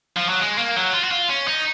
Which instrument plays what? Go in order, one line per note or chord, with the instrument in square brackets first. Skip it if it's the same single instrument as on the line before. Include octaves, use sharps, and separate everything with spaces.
[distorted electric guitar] F3
F#3
G#3
A#3
F#3
F4
F#4
F4
C#4
D#4